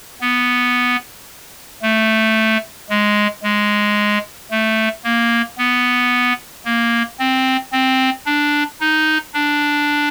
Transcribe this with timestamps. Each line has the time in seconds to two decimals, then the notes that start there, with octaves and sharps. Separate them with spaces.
0.21 B3
1.82 A3
2.89 G#3
3.43 G#3
4.51 A3
5.04 A#3
5.58 B3
6.65 A#3
7.19 C4
7.72 C4
8.26 D4
8.80 D#4
9.34 D4